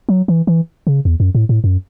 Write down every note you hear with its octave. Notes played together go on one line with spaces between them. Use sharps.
F#3
E3
E3
C#3
E2
F#2
A2
A2
F#2